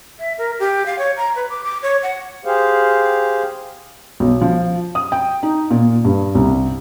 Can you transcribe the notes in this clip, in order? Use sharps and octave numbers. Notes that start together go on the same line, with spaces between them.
E5
A#4
G4
F5
C#5
A#5
B4
D6
D6
C#5
F#5
G4 G#4 C5 F5
B1
F3
D#6
G5
D#4
A#2
G2
C2